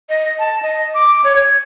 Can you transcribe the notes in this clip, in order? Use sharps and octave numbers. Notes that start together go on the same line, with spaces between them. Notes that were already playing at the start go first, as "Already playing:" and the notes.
D#5
A5
D#5
D6
C#5
G#6